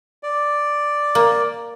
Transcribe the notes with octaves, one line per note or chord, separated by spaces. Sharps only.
D5
A#3